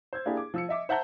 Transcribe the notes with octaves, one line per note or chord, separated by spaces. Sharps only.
C5 E6 G#6
A#3 D4 E4 G4 G#4
D6
F3 E6 C#7
D#5 E5 D6
C5 E5 F#5 A5 A#5 G6